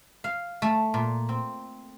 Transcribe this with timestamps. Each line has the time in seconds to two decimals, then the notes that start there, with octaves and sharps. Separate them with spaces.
0.24 F5
0.62 A3
0.94 A#2
1.29 C4